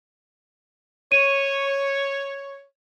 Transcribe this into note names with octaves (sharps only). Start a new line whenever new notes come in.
C#5 D#7